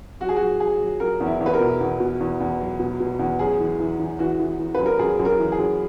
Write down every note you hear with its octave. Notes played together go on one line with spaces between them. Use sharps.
F#3 F#4
G#4
F#3 F#4
F#3 G#4
F#3
F#3 A#4
E2
E4
E2
B4
A#4
B2
E2
B2
E2
E2
F#3
B2
B2
E2
F#2 G#4
E3
E3
E3
E3 F#4
E3
E3
F#2 B4
A#4
F#2 G#4
F#2
A#4
E3
G#4
F#2